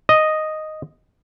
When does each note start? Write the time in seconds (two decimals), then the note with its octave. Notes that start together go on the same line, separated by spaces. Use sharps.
0.09 D#5